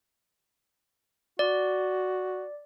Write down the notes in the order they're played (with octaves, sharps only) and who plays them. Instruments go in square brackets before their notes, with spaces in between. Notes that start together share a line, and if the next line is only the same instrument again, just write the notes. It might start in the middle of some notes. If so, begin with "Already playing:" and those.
[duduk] F#4 [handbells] D5